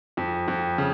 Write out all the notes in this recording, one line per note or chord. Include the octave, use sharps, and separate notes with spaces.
F2
F2
C#3